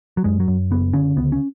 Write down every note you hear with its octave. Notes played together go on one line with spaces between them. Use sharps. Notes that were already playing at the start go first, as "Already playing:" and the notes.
F#3
F#2 G#3
F#3
F#2
F#1 B3
D3 C#4
C#2 B3
C#4